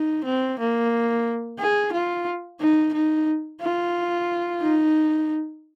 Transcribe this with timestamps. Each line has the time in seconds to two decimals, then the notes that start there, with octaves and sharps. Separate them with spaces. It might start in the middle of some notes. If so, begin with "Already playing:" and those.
Already playing: D#4
0.24 C4
0.59 A#3
1.59 G#4
1.92 F4
2.60 D#4
2.93 D#4
3.61 F4
4.61 D#4